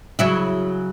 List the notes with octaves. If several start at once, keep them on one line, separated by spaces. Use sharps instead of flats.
C#3 F#3 E4